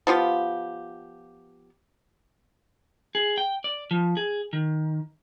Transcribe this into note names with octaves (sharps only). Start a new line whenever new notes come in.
F3 B3 F4 G4
G#4
G5
D5
F3
G#4
D#3